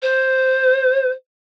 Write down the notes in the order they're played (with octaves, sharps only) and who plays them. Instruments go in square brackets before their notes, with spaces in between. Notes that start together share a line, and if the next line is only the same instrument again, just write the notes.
[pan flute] C5